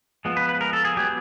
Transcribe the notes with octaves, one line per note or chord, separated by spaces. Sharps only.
F3 G#3 B3
B4
B4
A#4
A4
G#4
F#3 B3 G4